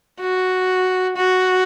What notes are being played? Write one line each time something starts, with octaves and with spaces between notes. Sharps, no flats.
F#4
F#4